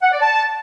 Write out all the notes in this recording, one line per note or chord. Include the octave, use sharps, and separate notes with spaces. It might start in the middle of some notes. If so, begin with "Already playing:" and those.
F#5
D5
A5